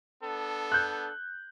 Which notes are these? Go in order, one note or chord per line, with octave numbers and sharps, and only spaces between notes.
B3 D4 A4
F#6 G6